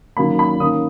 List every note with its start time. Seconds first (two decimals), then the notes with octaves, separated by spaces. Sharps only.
0.17 D#3 F#3 A#3 C#4 B5
0.39 B5
0.60 D#3 A#3 C#4 D#6